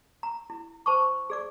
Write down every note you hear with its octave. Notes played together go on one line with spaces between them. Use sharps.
A#5
E4
C5 A5 C#6 D6
G#4 D5 D6